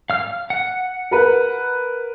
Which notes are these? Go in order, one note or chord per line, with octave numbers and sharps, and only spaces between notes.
F5 F6
F#5
A#4 B4